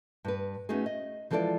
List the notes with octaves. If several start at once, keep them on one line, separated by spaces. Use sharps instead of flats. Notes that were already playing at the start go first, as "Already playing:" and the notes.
G2 B4
A3 B3 C#4 D#4 F#4 G#4
D#5
E3 F3 G#3 A4 C5 D5